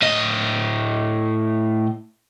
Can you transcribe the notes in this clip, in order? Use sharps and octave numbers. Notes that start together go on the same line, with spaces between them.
A2 D#5